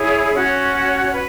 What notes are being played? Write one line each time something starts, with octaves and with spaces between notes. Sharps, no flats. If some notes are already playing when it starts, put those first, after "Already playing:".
Already playing: E4 G#4 C#5
C#4 F#4 C#5
B4